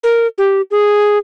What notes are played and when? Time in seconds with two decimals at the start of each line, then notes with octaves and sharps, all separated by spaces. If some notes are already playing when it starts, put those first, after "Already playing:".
0.04 A#4
0.38 G4
0.71 G#4